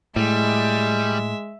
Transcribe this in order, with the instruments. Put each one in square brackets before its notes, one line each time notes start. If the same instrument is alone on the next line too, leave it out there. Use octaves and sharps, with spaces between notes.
[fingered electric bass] A2 [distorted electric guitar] G3 [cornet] G#3 [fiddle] E5